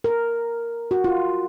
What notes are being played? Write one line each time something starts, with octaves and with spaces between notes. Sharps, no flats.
A#4
F#4
F4